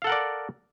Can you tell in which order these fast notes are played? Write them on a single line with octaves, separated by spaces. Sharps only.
F5 A4 F#5 A#4 D5